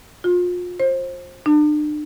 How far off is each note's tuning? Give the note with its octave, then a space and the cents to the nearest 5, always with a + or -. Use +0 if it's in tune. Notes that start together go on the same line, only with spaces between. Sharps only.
F4 +35
C5 +25
D4 +40